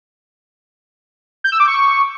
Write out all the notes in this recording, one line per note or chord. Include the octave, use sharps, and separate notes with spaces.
G6
E6
D6
C#6